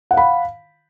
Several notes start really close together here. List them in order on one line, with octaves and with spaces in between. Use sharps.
F#5 F5 B5